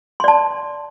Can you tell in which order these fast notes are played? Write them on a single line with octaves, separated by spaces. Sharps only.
C6 D5 A5